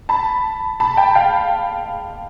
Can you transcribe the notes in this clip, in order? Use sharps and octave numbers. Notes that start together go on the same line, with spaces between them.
A5 B5
A5 B5
G5 A5
F5 G5